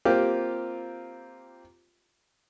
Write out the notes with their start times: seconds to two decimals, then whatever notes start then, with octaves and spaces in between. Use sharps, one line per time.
0.05 A#3 C4 F4 G4